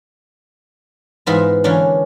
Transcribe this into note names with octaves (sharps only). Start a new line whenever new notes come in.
G#2 E3 B3 F4 E5 A#5
D3 E3 A#3 C#4 D4